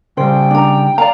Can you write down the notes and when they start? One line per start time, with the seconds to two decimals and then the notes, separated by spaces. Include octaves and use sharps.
0.17 C#3 G3 C5 G5
0.51 D4 A#5
0.98 D5 F5 A#5